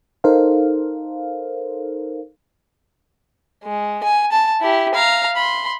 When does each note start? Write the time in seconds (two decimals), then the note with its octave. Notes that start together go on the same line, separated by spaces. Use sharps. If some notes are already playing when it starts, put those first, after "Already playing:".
0.24 D#4 A4 A#4 C5 F5
3.64 G#3
4.03 G#5
4.32 A5
4.61 E4 G4
4.94 F5 A#5
5.36 B5 C6